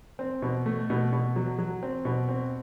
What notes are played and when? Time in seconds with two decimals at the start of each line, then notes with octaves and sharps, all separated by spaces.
0.19 C4
0.42 B2
0.66 A3
0.90 B2
1.13 B2
1.36 F#3
1.59 F#3
1.83 C4
2.05 B2
2.29 C4